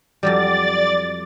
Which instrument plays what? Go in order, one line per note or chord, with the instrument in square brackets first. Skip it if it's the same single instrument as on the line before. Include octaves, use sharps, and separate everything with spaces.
[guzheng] F2 F#3 G3 [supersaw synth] D5 A6